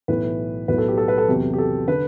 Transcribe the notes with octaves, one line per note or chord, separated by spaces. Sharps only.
B1 A2 E3 B4
B1 A2 F#3 B4
A4
G4
A4
B4
A4
E2 C3 F#3 G4
G4
A4
D3 B4